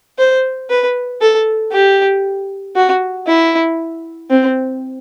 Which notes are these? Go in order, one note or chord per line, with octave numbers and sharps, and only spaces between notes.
C5
B4
A4
G4
F#4
E4
C4